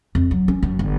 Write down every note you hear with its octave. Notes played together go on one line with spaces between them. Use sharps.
F2
F#3
C#4
F#2
G1